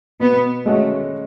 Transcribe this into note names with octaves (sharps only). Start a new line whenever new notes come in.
B2 B3
G#3 A3 C#4 F#4